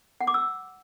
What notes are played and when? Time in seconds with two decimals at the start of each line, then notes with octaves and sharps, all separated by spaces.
0.21 F#5
0.27 D6
0.34 E6